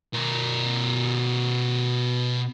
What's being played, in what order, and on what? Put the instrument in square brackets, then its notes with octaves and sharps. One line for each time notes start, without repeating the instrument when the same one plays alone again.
[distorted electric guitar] B2 A#4